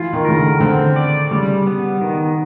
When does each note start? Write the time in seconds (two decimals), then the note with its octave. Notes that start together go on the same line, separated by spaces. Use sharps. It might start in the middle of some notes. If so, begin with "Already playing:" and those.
Already playing: E3 F4
0.13 D#3
0.25 C#3 A#4
0.37 D3
0.60 D3 C4
0.96 D5
1.31 C#3 G3
1.67 B3
2.01 D#3